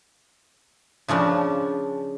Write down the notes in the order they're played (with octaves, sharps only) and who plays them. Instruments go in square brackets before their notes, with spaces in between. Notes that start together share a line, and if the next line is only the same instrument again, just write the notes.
[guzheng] C#3 F3 C#4 D4